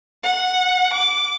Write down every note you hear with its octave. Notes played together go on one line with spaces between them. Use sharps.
F#5
D6